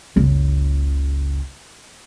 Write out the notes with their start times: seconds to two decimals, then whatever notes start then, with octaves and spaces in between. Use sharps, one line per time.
0.16 F#1 C#2